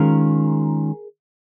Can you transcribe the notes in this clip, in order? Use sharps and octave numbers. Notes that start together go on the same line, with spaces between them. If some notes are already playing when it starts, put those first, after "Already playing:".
Already playing: D#3 G#3 C#4 F4 G#4 A#4